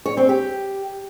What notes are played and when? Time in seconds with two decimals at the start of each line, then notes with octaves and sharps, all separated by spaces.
0.06 C#5
0.17 C4
0.29 G4